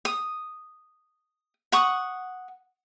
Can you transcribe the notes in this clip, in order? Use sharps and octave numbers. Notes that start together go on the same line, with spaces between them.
D#6
F#5 C#6 D#6